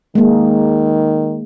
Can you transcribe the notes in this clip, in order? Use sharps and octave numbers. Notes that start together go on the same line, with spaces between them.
D#3 G#3 A#3